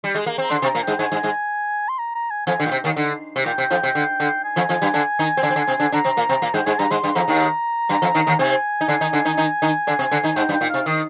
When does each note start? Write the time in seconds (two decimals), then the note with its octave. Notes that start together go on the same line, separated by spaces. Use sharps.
0.04 G3
0.15 G#3
0.26 A#3
0.38 C4
0.44 A#5
0.50 D3 D4 C6
0.62 C3 C4
0.66 A#5
0.75 A#2 A#3
0.83 G#2 G#3 G5
0.99 G#2 G#3 G#5
1.12 G#2 G#3
1.23 G#2 G#3
1.88 C6
1.99 A#5
2.15 A#5
2.30 G#5
2.47 F2 F3 G#5
2.60 D3
2.63 A#2 G5
2.71 C3
2.84 D#2 D#3
2.96 D3
3.36 C3
3.46 A#2 G5
3.58 C3
3.70 F2 F3
3.83 C3
3.95 D3
4.20 D3
4.44 G#5
4.56 F2 F3
4.69 F2 F3
4.82 G2 G3
4.94 D3 D4
5.19 D#3 D#4
5.37 C4
5.43 D3 D4
5.50 C4
5.56 D3 D4
5.68 C3 C4
5.80 D3 D4
5.92 D3 D4 A#5
6.04 C3 C4
6.17 A#2 A#3
6.29 C3 C4
6.42 A#2 A#3
6.54 G#2 G#3 G5
6.66 G#2 G#3 G#5
6.79 G2 G3 A#5
6.91 G#2 G#3 C6
7.04 G2 G3
7.15 F2 F3 A#5
7.28 D#2 D#3
7.89 G2 G3
8.02 F2 F3
8.15 D#2 D#3
8.27 D#2 D#3
8.39 C3 C4 G#5
8.81 D#4
8.88 D3 D4
9.01 D#3 D#4
9.13 D3 D4
9.25 D#3 D#4
9.37 D#3 D#4
9.62 D#3 D#4
9.87 D3 D4
9.99 C3 C4
10.11 D3 D4
10.24 D#3 D#4
10.28 G#5
10.36 G#2 G#3 G5
10.49 G2 G3
10.53 G5
10.61 A#2
10.70 C3 F5
10.86 D#3 D#5